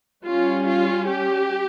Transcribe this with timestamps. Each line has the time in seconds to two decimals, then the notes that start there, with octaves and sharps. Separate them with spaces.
0.25 G3 C#4 F4
0.67 F4
1.08 G4